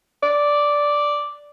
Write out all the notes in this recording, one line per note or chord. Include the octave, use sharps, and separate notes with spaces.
D5